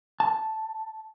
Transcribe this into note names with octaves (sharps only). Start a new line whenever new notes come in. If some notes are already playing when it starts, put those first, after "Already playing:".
A5